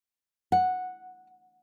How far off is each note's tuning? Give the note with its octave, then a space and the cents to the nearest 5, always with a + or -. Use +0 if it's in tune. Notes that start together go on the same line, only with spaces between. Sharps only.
F#5 -5